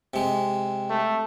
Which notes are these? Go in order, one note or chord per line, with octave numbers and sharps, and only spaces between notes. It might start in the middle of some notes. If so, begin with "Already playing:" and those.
C3 G#3
A3